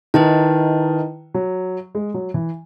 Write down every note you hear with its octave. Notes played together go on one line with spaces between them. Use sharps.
D#3 E4 B4 D#5 A5
F#3
G#3
F#3
E3